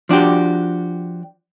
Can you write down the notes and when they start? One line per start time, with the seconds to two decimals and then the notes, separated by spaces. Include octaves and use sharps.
0.09 F3 D4 F#4 G4